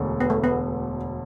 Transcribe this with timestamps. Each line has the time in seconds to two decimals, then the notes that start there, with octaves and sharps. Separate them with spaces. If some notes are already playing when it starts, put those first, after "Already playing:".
Already playing: E1 D2 D3
0.21 B3
0.30 A3
0.44 B3